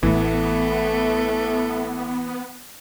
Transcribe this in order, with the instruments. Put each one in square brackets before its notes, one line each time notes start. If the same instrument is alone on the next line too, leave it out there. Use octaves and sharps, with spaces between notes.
[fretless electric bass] A1 A2 [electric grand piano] E3 [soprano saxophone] A3 [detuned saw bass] B3